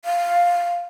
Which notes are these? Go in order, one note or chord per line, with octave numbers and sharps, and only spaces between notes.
F5